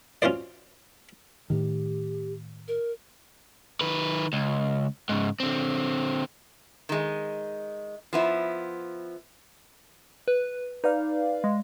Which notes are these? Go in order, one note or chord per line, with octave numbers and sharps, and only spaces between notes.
C#4 F4 F#4 C5 D5
A2 D#3 G4
A#4
D#3 B4
C#2
G#2 C#3
D3 C4
D#3 G#3
F3 B3 E4
B4
D#4 B4 D5 F5
G#3